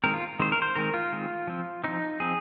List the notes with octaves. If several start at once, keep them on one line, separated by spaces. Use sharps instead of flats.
D#3 G#3 C4 A#4
F4
D#3 G#3 C4 C5
A#4
C5
D#3 G#3 C4 A#4
F4
D#3 G#3 C4
F3 C4
F3 C4 D#4
F3 C4 G#4